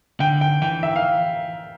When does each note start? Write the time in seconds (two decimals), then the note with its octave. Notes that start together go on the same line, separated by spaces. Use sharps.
0.20 D3 G5
0.41 G5
0.62 E3 G5
0.83 E5
0.96 F5